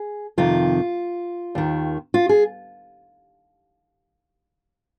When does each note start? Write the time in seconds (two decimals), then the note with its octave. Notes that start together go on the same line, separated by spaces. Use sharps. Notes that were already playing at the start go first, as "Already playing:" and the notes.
Already playing: G#4
0.38 F2 C3 D#3 F4
1.55 D#2 D#3
2.14 F4
2.29 G#4